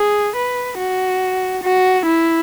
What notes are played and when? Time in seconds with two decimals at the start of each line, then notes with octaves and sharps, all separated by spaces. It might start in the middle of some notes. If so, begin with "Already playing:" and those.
Already playing: G#4
0.36 B4
0.78 F#4
1.63 F#4
2.06 E4